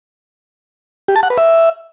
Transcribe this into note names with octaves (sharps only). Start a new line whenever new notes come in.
G4
A5
F#5
B4
E5